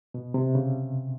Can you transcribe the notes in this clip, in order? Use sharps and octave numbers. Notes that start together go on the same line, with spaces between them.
B2
C3
C#3